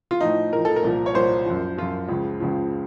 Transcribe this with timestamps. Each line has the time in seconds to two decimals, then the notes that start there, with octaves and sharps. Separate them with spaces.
0.11 F4
0.21 A2 F3 D#4
0.52 A2 F3 A#4
0.65 A4
0.76 A#4
0.83 C2 A#2 F3
1.06 C#5
1.15 C2 A#2 F3 C5
1.46 F#2 F3
1.77 F#2 F3 F4
2.09 C#2 C#3 F3
2.40 C#2 C#3 F3